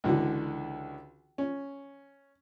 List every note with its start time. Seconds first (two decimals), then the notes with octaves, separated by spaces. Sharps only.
0.04 C#2 D3 E3 F#4
1.38 C#4